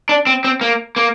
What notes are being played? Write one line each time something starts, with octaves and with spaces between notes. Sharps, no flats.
D4
C4
C4
A#3
A#3